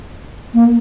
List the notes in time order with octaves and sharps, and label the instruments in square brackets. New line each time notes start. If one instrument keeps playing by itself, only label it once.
[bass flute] A#3